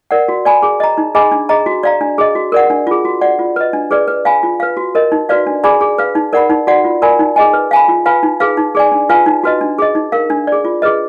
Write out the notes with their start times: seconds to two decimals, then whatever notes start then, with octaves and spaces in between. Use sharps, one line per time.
0.11 A#4 D5 F#5
0.28 F#4
0.45 D5 G#5 B5
0.62 G#4
0.80 D#5 A#5
0.98 D#4
1.15 G#4 D#5 G#5 B5
1.32 D4
1.49 G#4 D#5 A#5
1.66 F#4
1.83 D5 F5 A#5
2.01 D4
2.18 G#4 D#5
2.35 F#4
2.52 A#4 D5 F#5
2.70 D4
2.87 F4 G#4
3.05 F#4
3.21 D5 F#5
3.39 F4
3.56 B4 D#5
3.73 D4
3.91 G#4 B4 D5
4.08 B4
4.25 F5 G#5 B5
4.43 F4
4.60 B4 F5
4.77 F#4
4.95 A#4 D#5
5.12 D#4
5.29 F#4 B4 D5 F5
5.47 D4
5.64 G#4 D5 G#5 B5
5.81 G#4
5.98 B4 F5
6.15 D#4
6.33 A#4 D5 F#5 B5
6.50 D#4
6.67 F#4 D5 F#5
6.85 F4
7.02 A#4 D5 G#5 B5
7.19 D#4
7.36 G#4 D#5 G#5
7.53 B4
7.71 F5 G#5 B5
7.88 F4
8.06 B4 F5 G#5 B5
8.23 D#4
8.40 G#4 B4 F5
8.57 D#4
8.75 G#4 D5 G#5
8.92 D4
9.09 F4 B4 F5 G#5
9.26 D#4
9.44 F#4 B4 D#5
9.61 D4
9.78 G#4 D#5
9.95 D#4
10.12 A#4 F5
10.30 D4
10.47 G#4 D5
10.65 F4
10.82 G#4 B4 D#5